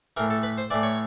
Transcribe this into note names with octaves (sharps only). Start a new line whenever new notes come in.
A2 E3 A#4
A4
B4
C5
A2 E3 D5
C#5